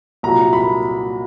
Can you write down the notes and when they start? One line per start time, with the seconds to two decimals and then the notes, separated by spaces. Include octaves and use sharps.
0.23 C2 A#2 F#3 A#5
0.53 B5